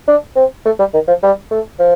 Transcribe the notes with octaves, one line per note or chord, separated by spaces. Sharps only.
D4
C4
A3
G3
D#3
F3
G3
A3
F3